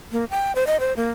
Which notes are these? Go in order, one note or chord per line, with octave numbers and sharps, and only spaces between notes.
A#3
G5
C5
D#5
C5
A#3